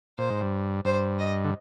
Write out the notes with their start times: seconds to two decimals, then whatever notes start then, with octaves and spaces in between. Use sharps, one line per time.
0.18 A#2 C5
0.30 G#2
0.41 G2
0.85 G2 C5
1.19 D#5
1.44 D3